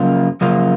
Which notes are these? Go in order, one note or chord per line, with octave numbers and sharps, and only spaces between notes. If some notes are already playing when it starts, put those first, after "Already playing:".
Already playing: F#2 C#3 F3 A#3 F4
F#2 C#3 F3 A#3 F4